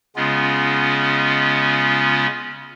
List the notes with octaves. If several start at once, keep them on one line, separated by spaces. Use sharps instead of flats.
C#3 G#3 B3 C#4 F4